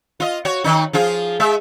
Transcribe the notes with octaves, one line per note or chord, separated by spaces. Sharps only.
F4 D#5
F#4 C#5
D#3 D#4
F3 F4 G#4
G#3 E5